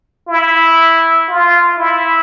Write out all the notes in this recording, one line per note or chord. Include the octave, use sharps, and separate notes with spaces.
E4
F4
E4